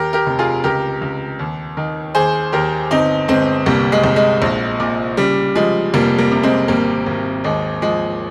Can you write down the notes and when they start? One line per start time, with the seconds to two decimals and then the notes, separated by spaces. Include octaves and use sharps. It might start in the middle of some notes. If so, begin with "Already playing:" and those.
Already playing: D#2 G4 A#4
0.13 G4 A#4
0.27 F1
0.39 F4 G#4
0.64 C#2 G4 A#4
1.01 C#2
1.39 D#2
1.77 D#3
2.15 D#2 G#4 C5
2.52 D#2 G4 A#4
2.91 G1 C4 D#4
3.28 G1 G#3 C4
3.66 C2 G3 A#3
3.92 G#3
4.04 C2
4.16 G#3
4.42 A#1
4.80 A#2
5.17 C#3 G3
5.55 F3 G#3
5.94 F1 G3 A#3
6.18 G3 A#3
6.31 C3
6.43 G#3 C4
6.68 G#1 G3 A#3
7.06 G#1
7.44 D#2 G#3
7.82 F3 G#3